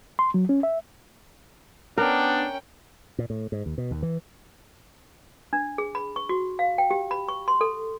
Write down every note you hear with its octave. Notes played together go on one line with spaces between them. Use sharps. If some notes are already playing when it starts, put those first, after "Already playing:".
C6
F#3
C#4
E5
B3 C#4 D4 A#4 G5
A#2
A2
G#2
D#2
B2
D#2
E3
D4
G#4
B5
C#6
F#4
F5
G5
G4
B5
C#6
C6
A4